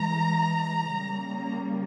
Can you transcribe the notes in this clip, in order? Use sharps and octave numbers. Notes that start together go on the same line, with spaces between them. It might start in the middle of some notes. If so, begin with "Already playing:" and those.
Already playing: E3 G#3 A#5
C#3 G3 A#3